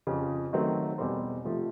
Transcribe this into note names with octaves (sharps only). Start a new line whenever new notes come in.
F2 C#3 F3
D#3 F#3 A3 C4
E2 B2 G3 C4
C3 F3 A3